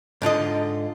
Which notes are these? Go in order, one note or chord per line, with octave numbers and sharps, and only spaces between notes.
G#2 D3 F4 D#5